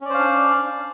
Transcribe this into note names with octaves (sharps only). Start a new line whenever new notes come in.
C#4 D4 C5 D5 F5